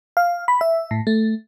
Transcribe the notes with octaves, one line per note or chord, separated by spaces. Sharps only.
F5
B5
E5
A2
A3